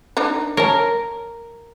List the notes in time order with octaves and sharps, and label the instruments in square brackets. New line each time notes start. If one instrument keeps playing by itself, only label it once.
[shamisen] D4 D#4 A#4
[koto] A#4 [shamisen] C#5 A5